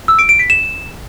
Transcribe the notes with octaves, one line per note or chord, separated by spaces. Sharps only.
E6
D7
D7
B6
E7